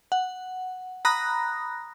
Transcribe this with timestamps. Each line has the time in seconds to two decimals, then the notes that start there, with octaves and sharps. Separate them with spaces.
0.12 F#5
1.05 A#5 B5 D#6 F#6 A#6